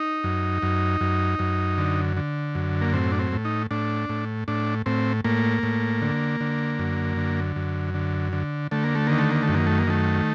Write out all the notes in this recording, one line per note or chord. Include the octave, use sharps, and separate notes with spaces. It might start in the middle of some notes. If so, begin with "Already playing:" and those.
Already playing: D#4
F#2
F#2
F#2
F#2
D3
D3
F#2
A#3
A2 C4
D4
C4
A2
D#4
A2 D4
A2
A2 D4
A2 C4
A2 A#3
A2
D3
D3
F#2
D3
F#2
D3
D3
D3 A3
A#3
A3
D#3 A#3
A3
A#3
A3
F#2
A#3
A3
A#3
D#3 A3